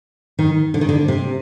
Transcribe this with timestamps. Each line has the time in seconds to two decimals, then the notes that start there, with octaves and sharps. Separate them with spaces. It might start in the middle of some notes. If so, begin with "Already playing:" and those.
0.39 D#3
0.74 D3
0.81 D#3
0.89 D3
1.08 C3